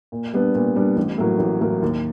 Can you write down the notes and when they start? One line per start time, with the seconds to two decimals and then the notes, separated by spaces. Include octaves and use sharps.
0.12 A#2
0.33 G3 B3 D4
0.55 A#2
0.76 G3 B3 D4
0.97 A1
1.18 A2 F#3 A#3
1.39 A1
1.61 A2 F#3 A#3
1.82 D#2